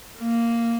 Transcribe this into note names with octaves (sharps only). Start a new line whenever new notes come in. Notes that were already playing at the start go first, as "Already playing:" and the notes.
A#3